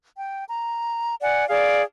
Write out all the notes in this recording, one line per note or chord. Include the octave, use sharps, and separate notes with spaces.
G5
A#5
D5 F#5 G#5
G#4 D5 F5